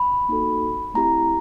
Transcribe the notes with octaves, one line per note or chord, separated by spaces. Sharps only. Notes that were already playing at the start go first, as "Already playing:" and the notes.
Already playing: B5
A#3 D#4 F#4 A4
A3 C4 E4 G4 A#5